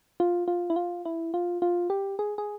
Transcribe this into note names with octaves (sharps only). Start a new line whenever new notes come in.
F4
F4
E4
F4
E4
F4
F4
G4
G#4
G#4